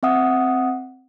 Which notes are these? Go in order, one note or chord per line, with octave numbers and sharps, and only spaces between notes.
C4 E5 F#5 D#6